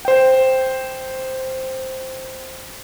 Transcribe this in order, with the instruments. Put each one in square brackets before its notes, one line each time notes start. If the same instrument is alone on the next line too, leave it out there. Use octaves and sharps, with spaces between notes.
[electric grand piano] C5 G5